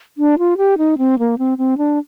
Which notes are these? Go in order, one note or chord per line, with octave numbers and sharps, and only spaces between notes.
D4
F4
G4
D#4
C4
A#3
C4
C4
D4